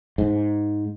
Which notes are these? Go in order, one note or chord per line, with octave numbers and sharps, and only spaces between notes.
G#2